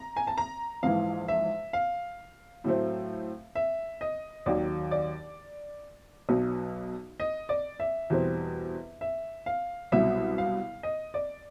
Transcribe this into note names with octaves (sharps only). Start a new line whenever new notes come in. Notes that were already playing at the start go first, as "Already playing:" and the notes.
Already playing: A#5
G#5
A5
A#5
A#1 G#2 E3 F5
E5
F5
A2 F#3 A3 C4
E5
D#5
D#2 D#3 F#3 D5
D5
B1 B2 F#3
D#5
D5
E5
E2 B2 G3 C4
E5
F5
C2 B2 F#3 E5
F5
D#5
D5